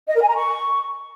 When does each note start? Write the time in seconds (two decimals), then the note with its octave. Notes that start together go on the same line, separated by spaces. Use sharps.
0.08 D#5
0.15 A#4
0.22 G#5
0.28 A#5
0.35 C#6